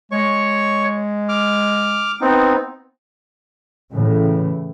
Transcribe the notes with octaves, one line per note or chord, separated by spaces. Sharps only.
G#3 C#5 C#6
D6 F6
B3 C4 D#4
A2 C#3 E3